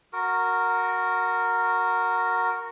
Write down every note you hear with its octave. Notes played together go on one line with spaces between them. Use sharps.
F#4 A#4